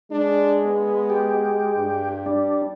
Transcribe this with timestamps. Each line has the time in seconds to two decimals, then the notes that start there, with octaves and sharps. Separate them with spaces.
0.11 G#3 D4
0.66 B3
1.10 G4
1.76 G2
2.26 G3 D4